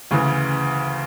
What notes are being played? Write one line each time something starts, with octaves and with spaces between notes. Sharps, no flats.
D2 C#3 E3